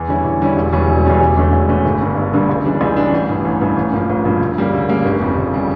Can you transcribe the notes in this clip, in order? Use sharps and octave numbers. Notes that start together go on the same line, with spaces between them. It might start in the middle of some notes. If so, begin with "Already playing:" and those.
Already playing: E2
D3 G3 C#4 E4
E2
D3 G3 C#4 E4
E1
E2 C#3 G3 C#4
E1
E2 C#3 G3 C#4
E1
E2 D3 A3 C#4
E1
E2 D3 A3 C#4
G1
G2 D3 G3 A#3
G1
G2 D3 G3 A#3
C#2
C#3 E3 G3 D4
C#2
C#3 E3 G3 D4
A1
G2 E3
A1
G2 E3
A1
G2 F3 A#3
A1
G2 F3 A#3
D2
C#3 G3 A#3
D2
C#3 G3 A#3
G1
F2 C#3 G3
G1
C#3 G3